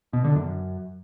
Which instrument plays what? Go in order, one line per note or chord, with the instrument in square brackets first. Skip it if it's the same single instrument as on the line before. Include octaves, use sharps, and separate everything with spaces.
[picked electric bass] B2
D3
F#2